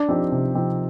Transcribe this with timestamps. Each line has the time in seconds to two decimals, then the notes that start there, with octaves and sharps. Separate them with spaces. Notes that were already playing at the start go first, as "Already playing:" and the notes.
Already playing: D4
0.08 F3 C4 D#4 G4
0.32 C3
0.55 F3 C4 D#4 G4